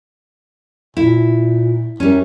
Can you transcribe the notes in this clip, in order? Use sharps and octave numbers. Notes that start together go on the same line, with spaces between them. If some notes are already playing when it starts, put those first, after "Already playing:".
A#2 E4
F#2 G3 C#4